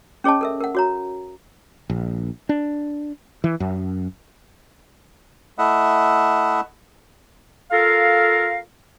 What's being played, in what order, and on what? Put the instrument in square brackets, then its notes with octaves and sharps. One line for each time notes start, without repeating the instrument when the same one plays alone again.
[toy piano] C#4 G#4 C#5 D#5 A5
A4 A#4 E5
A#4 F#5
F#4 C#5 A#5
[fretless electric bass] A#1
D4
E3
F#2
[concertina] A3 E4 D#5 E5 F#5
[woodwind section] F4 A4 A#4 F5